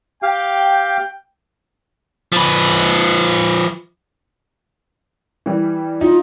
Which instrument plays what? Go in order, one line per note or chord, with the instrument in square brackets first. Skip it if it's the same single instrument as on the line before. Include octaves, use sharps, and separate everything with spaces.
[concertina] G4 F5 [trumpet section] G5
[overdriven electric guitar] F3 B4
[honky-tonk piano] E3 G3
[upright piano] D#4 [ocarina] F4